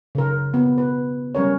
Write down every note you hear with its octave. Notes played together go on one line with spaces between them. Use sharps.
C#3 A#4
B3
B4
G3 C#4 A#4 C#5